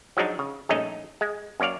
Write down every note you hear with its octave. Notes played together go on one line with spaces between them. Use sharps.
F3 F#3 G#3 D4 D#4
C#3
A#1 G2 A3 C#4 D#4 D#5
G#3
F#2 A#3 C#5 D5 F5